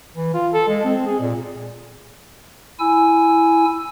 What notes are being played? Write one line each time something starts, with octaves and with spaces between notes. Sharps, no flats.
E3
F4
A4
G#3
C4
G#4
A#2
E4 G#5 E6